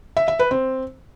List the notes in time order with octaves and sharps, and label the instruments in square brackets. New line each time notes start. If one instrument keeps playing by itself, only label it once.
[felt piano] E5
E5
B4
C4